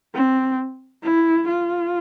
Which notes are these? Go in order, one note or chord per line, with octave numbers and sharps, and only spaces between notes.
C4
E4
F4